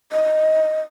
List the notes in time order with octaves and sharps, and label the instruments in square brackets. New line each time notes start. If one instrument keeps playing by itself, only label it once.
[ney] D#5